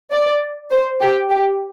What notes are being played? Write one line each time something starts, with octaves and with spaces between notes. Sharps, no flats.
D5
C5
G4
G4